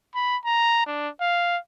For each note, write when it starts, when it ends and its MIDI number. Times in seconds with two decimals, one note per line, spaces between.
0.15 0.37 83
0.45 0.84 82
0.87 1.09 62
1.21 1.58 77